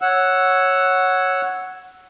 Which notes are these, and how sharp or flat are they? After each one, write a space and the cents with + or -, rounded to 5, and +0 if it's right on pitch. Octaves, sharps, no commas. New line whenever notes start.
C#5 +0 F#5 +0 E6 +0